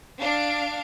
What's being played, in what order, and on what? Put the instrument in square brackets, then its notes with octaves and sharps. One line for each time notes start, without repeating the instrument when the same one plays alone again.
[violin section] D4 F5 D7